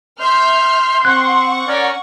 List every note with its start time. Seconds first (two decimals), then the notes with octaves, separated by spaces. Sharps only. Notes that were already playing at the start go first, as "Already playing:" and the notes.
0.20 E5 C6 F6 G6
1.05 C4 F#5 C#6 F#6
1.68 C#4 A#4 D5